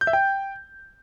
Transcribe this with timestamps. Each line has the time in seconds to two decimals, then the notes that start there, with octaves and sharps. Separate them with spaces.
0.01 G6
0.07 E5
0.13 G5